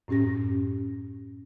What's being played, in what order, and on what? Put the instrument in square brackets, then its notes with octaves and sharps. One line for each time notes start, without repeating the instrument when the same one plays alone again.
[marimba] F#2 A2 C#4 G4 A#6